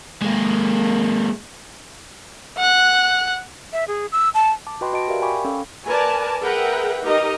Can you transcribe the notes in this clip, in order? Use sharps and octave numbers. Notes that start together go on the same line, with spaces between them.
G#3 A#3
F#5 F#6
E5
G#4
E6
A5
A5 D6
F#4 B4 D#5 G5 B5 C6
F#4 D#5 A5 D7
G4 A#4 D5 E5 F5
G5 G#5 B5 C#6 D6
C#4 A4 F5
A#4 B4 D5 G#5 A5
G#4 A#4 B4 E5 F#5 G5
D#4 G4 A#4 D#5